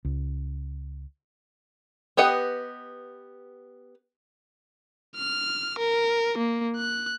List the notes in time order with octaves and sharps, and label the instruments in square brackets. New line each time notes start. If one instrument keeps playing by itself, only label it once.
[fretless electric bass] C#2
[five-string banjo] B3 G4 B4 D#5 F#5
[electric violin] F6
A#4
A#3
F#6